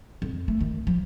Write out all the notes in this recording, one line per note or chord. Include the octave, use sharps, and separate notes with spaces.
F2
A3
D#3
F3